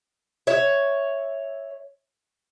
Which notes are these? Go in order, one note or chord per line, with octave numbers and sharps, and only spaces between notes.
C#5 E5